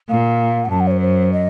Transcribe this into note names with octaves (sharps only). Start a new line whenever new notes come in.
A#2 F5
F#5
F#2 A5
F#5
C#5
C5
C5
D#5